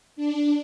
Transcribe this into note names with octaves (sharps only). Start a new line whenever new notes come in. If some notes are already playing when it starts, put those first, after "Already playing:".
D4